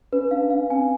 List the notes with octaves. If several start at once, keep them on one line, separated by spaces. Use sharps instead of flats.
C#4 B4
D4 F5
C#4 F5
C4 G#5